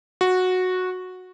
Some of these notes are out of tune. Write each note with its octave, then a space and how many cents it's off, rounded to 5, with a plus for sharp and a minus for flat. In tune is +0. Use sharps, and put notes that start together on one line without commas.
F#4 -10